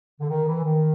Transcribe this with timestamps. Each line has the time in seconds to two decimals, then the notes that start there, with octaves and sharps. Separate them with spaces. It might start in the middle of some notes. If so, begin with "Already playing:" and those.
0.20 D3
0.29 D#3
0.48 E3
0.64 D#3